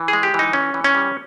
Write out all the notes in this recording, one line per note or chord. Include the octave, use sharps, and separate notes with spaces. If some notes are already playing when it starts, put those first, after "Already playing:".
Already playing: E3
G#4
G#3
G4
E3 D#4
C#4
E3
C#4
G3